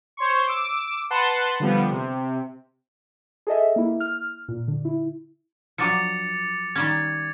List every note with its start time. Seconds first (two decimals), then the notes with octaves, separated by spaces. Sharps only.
0.17 C5 C#5 C6 C#6
0.47 D6 E6
1.10 B4 F#5 A5 C6
1.60 D3 F3 G3 B3
1.90 C3
3.47 G#4 A4 D#5 E5
3.76 A#3 E4
4.00 F6
4.48 A#2
4.68 D3
4.85 E4
5.78 F3 F#3 D4 D6 A6 C#7
6.76 D#3 G3 C#4 G#6 A6